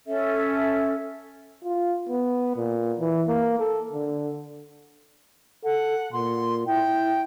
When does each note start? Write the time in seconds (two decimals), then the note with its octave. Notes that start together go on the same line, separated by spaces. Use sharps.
0.07 C#4 A4 E5
1.65 F4
2.09 B3
2.57 A#2
3.00 E3
3.28 A#3
3.60 A4
3.93 D3
5.64 A4 F#5
6.12 A#2 C6
6.66 E4 G5